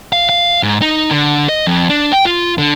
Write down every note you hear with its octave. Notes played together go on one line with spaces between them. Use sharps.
F5
F5
G#2
D#4
D3
D#5
F2
D4
G5
F4
D3